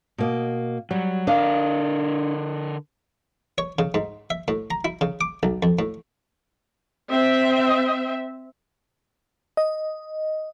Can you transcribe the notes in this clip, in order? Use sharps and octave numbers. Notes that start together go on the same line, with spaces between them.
B2 A#3 D#5
F#3 G3
D3 D4 A#4 D#5 F5
C#5
C#3
G#2
E5
A2
A#5
E4
C#3
D6
B1
F2
A2
C4 E5
D#5